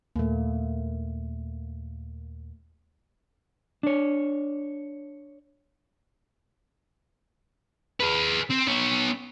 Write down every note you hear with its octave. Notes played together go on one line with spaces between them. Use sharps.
D#2 A#2 A3 A#3
D4 C#5
G#4 B4
C4
B3 C#5